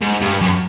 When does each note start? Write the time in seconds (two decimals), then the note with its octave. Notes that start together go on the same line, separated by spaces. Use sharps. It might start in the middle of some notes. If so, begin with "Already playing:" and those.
0.02 G#2
0.22 G2
0.41 F#2